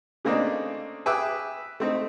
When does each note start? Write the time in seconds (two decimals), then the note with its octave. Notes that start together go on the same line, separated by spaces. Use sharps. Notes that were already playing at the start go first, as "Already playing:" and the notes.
0.25 C#3 A3 A#3 C4 D4 D#4
1.06 G#4 B4 E5 G5 D6 E6
1.80 A3 C4 D#4